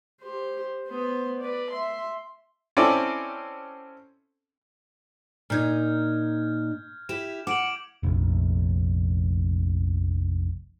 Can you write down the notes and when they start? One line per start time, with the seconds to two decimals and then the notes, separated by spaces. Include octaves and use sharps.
0.22 G4 C5
0.88 B3 C5
1.41 B4 D5
1.71 E5 C6
2.77 C4 C#4 E4 A4 D5
5.50 A#2 D#4 F6 G6 G#6
7.09 E4 G4 E7
7.47 F#5 D6 D7 F#7
8.03 F1 A#1